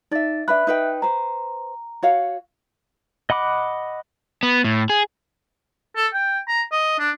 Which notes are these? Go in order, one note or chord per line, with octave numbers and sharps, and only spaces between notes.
D#4 D5 E5 A6
D4 B4 E5 B5 F#6
D#4 B4 G5
B4 C5 A#5
F#4 C#5 F5
D#5 F#5 B5 D6
B3
A2
G#4
A4
G5
A#5
D#5
D4